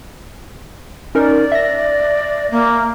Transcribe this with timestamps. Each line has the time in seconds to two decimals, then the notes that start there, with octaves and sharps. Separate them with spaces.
1.15 C#4 D#4 A#4 D5
1.52 E5 A#6
2.51 A#3